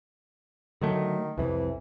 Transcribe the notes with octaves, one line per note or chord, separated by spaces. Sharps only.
D3 D#3 F#3 A3
C2 F2 E3